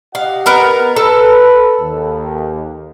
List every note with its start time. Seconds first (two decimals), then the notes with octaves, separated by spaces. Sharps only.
0.15 G4 D#5 F5 F#5
0.46 B3 A#4 A#5
0.96 A4 B4
1.79 D#2